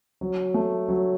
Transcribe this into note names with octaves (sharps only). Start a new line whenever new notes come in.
F#3
A3
F#3